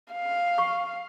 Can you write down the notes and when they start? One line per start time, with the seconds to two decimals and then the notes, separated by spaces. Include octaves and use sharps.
0.13 F5
0.58 C#6